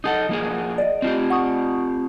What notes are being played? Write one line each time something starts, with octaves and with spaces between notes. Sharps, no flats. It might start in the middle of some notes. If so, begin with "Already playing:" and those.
D#4 G#4 A4 F#5 D#6
F3 A#3 G#4
D5 D#5
C4 F4 G4
F#5 C#6 D#6